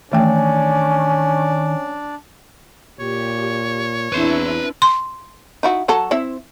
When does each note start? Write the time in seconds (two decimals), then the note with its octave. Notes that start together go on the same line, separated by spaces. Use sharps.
0.12 D#3 E3 A3 C#4 D4 D5 G5
2.99 A#2 G4 C#5
4.12 E2 C4 D4 E4 B4 C6
4.82 C6
5.63 D#4 E4 F#4
5.88 F#3 F#4 A4
6.11 C4 E4 E5